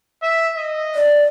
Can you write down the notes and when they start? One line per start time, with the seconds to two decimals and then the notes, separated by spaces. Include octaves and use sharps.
0.23 E5
0.56 D#5
0.95 D5